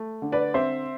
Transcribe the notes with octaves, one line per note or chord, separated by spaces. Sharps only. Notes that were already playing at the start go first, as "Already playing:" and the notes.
Already playing: A3
D3
B4 D5
C4 C5 E5